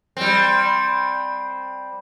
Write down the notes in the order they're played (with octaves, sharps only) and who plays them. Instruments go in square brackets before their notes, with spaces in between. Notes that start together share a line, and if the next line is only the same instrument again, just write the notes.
[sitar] G3 C4